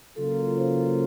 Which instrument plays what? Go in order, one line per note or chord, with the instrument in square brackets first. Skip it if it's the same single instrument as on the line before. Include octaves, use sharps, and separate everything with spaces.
[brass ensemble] C#3 F#3 A#3 F4 [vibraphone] A4
[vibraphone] C5